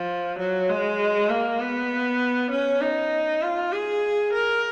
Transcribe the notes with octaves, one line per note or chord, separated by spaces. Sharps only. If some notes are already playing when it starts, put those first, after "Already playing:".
Already playing: F3
F#3
G#3
A#3
B3
C#4
D#4
F4
G#4
A#4